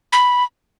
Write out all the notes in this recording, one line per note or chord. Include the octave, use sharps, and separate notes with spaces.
B5